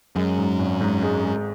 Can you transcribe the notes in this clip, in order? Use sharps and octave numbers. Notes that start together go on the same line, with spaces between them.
F#2 G#3
G#2
G#1
G#2
G#3
G#3